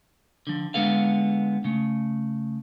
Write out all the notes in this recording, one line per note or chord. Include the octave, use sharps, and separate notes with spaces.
D3 F3
D3 G#3 B3 A4 F5
C#3 A3